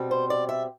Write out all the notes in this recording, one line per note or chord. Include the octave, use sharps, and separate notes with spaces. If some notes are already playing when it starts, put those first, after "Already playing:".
Already playing: B2 G3 C4
C5
D5
E5